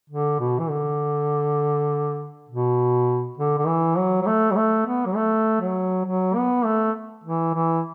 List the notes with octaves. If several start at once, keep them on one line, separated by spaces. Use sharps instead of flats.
D3
B2
E3
D3
B2
D3
D3
E3
F#3
F#3
A3
F#3
A3
B3
F#3
A3
F#3
F#3
B3
A3
E3
E3